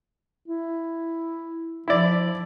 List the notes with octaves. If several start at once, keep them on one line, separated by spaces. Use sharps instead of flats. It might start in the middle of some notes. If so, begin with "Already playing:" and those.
E4
F3 E4 D5